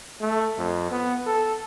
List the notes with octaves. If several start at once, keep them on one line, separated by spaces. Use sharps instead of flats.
A3
F2
B3
A4